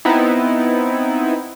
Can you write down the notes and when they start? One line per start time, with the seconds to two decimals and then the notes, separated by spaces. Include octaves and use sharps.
0.05 B3 C4 D#4 E4